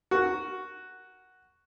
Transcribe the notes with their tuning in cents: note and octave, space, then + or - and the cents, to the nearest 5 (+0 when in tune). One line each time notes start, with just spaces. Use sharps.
F#4 +0 A#4 +0